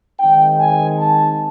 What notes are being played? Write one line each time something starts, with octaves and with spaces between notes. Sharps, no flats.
D#3 G#3 C4 D#4 G5
G#5
A5